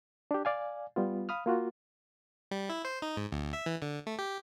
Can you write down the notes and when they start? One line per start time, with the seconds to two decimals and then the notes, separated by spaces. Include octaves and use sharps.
0.31 D4 G4
0.45 D5 F5 G#5
0.96 G3 B3 F4
1.29 F5 B5 D#6 F6
1.46 A#3 F4 F#4
2.51 G3
2.70 E4
2.85 C5
3.02 D#4
3.17 G#2
3.32 D2
3.53 E5
3.66 E3
3.82 D3
4.07 A3
4.19 G4